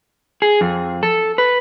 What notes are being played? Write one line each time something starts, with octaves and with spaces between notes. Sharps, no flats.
G#4
F2
A4
B4